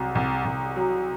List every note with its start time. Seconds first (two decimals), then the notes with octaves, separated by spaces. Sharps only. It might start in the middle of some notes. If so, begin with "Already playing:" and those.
Already playing: C2 F#3
0.15 C2
0.45 C2
0.76 F#3